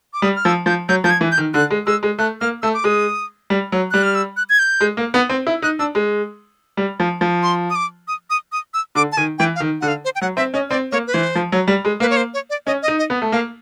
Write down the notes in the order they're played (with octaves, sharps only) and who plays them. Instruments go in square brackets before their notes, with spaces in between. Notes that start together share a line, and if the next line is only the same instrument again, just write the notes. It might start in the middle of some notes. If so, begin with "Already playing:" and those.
[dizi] D6
[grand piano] G3 [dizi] D#6
[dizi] F6
[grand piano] F3 [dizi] E6
[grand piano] F3 [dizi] G6
[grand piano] F#3 [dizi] G6
[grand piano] F3 [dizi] G6
[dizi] G#6
[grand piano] E3
[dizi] G6
[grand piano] D#3
[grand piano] D3 [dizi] F#6
[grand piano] G#3
[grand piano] G#3 [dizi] E6
[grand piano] G#3
[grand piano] A3 [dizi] F#6
[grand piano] A#3 [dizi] F6
[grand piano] A3 [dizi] E6
[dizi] D6
[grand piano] G#3 [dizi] D#6
[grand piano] G3
F#3
[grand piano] G3 [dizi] F#6
[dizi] F6
E6
F#6
G#6
G6
[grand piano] G#3
A#3
B3
C4
E4
[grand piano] D#4 [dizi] F#6
[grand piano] D4 [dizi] E6
[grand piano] G#3
G3
F3
F3
[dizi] C6
D#6
D6
D#6
D#6
D#6
E6
[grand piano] D3 [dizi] D6
[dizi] A5
[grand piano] D#3 [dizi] G#5
[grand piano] E3 [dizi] G5
[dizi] F5
[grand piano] D#3
[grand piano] D3 [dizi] F#5
[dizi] F5
C5
G5
[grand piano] F#3 [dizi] F#5
[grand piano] C4 [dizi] E5
[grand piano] C#4 [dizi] D#5
[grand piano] C4 [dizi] D5
[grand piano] A#3 [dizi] C#5
[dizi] B4
[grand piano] E3 [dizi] C5
[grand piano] F3
F#3
G3
G#3
[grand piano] A#3 [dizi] B4
[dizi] C#5
C5
C#5
D5
[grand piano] C#4 [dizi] D#5
[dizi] D#5
[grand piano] D#4
[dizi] D#5
[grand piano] B3
A3
[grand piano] A#3 [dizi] F5